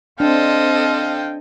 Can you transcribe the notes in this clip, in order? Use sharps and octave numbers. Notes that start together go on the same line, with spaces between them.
C4 D4 A4 D#5 F5 G5